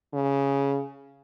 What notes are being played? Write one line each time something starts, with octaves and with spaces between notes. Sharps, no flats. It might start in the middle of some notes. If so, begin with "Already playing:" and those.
C#3